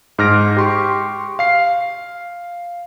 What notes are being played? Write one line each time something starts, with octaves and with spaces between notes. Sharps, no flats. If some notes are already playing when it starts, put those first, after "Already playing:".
G#2 F6 A#6 D7
G4 C6 C#6
F5 C7